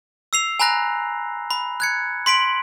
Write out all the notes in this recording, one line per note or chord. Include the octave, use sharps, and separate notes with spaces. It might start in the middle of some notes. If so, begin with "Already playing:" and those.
E6 C7 F7
G#5 A#5 B5 F#6 A#6
B5
F#6 G#6 C#7
C6 B6 D7 F#7